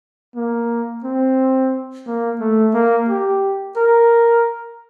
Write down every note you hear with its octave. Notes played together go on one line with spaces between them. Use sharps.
A#3
C4
A#3
A3
A#3
G4
A#4